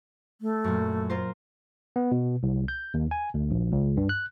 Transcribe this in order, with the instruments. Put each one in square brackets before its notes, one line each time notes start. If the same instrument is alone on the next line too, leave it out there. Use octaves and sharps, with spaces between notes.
[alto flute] A3
[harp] F#2 A#2
F4 A#4 C5
[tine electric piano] B3
B2
C2
G6
D#2
G#5
D2
A#1
C#2
G2
F#6